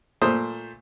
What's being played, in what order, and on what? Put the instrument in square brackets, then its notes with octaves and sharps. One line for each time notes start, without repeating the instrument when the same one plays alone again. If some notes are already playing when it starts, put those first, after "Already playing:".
[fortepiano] A#2 A3 C5 D#6